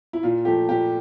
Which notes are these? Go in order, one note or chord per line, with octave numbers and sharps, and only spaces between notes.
E4
A#2 F4
F3 A3 G4
A#2 G4